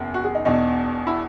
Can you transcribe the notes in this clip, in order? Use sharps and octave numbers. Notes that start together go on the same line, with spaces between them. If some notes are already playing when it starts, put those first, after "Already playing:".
Already playing: F#1 E2
F#4
G#4
D#4
E1 E2 B2 D#4
E4